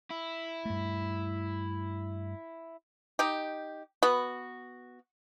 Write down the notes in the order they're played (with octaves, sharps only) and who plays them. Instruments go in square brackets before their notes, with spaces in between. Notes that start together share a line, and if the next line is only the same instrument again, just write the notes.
[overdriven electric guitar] E4
[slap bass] G2 A3
[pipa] D#4 G4
B3 F#4